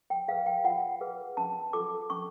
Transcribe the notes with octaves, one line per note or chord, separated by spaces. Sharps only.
G5
G#4 B4 F5
G5
F4 F#5
G#4 B4
C#4 A5
F4 A4 D6
C#4 C#6